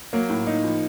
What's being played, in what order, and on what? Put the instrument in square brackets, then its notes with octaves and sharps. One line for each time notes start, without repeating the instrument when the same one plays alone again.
[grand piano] F#3 [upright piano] A#3
[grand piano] A2
D#4
F3